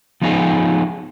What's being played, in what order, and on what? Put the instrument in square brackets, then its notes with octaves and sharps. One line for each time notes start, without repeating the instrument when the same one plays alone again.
[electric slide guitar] F3 B3 D#4 F4 G#4